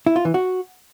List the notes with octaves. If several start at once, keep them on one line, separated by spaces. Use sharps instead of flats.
E4
F4
E3
F#4